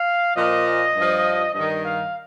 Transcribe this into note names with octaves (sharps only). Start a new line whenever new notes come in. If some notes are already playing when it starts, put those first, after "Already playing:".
Already playing: F5
A#2 F3 D#5
G2 F3
G2 D#3 D#5
F5